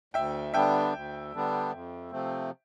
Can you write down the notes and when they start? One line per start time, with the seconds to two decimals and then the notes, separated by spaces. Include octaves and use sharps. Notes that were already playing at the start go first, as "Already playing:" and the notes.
0.14 D2 E5 G5
0.54 D3 G3 B3 D4 E5 G5
0.93 D2
1.33 D3 G3 B3 D4
1.72 F2
2.11 C3 F3 A3 C4